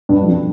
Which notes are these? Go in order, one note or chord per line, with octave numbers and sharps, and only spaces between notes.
G2
F2